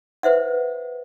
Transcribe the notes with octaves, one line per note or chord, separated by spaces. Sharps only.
B4 C5 E5 F#5